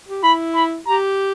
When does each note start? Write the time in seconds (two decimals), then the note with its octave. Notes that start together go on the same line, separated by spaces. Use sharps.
0.09 G4
0.23 E4 B5
0.55 B5
0.86 G4 A#5